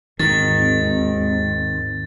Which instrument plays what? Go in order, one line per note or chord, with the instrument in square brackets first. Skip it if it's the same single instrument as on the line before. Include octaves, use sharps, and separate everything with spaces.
[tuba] G#1 [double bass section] D#2 G#2 C4 [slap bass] D#3 [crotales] A6